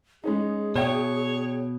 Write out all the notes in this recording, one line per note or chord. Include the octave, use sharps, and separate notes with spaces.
G#3 C#4 D#4 G#4
B2 C#5 D5 E5 G5